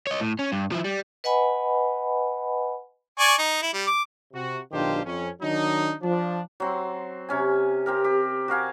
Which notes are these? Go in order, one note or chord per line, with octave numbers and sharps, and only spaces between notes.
C#5 D#5
A2
C#4
G2
F3 E4
G3
B4 D#5 F#5 G#5 B5
D5 G#5 C#6
D#4
E4
G3
D6
C3 F#4
B1 D#3 D4 F4 G4 C5
F2 C#4
D#3 F#3 D4 D#4
F3 D4
F#3 C4 C6
C3 C#4 G#5
C4 G4 A#4
G4
F#4 A#4 F5 G#5